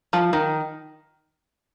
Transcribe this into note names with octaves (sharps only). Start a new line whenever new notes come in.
F3
D#3